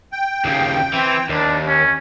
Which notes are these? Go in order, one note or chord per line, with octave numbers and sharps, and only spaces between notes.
G5
D#2 C#3
E3 C4
D#2 D4
C#4